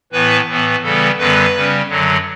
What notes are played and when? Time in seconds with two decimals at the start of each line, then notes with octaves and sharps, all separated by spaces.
0.12 A2 E3 B3 B4
0.48 A2 E3 B3
0.83 C#3 E3 G3 B3 A4
1.18 F#2 D3 G3 B3 B4
1.54 C#3 G3 C#4
1.89 F#2 D3 F#3